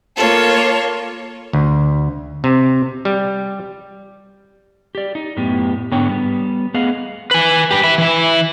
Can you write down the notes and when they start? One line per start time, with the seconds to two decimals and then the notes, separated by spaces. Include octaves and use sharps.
0.17 A#3 F4 A4 C#5
1.53 D2
2.44 C3
3.05 G3
4.95 G4 D5
5.15 D#4
5.37 F#2 A2 B3 G4
5.91 G#2 D3 B3 C#5 G5
6.09 G3 B3
6.74 A3 B3 G#4 D#5 F5 F#5
7.31 B4 G#5
7.71 G4 B4
7.84 B4 E5
7.98 E3 E4